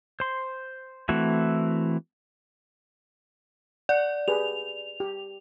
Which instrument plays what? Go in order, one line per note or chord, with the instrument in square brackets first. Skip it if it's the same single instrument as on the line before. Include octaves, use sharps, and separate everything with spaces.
[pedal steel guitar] C5 C6
E3 A3 C4 E4 F#4
[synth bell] D5 [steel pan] F#5
[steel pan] G4 G#4 B4 [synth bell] F7
[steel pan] G4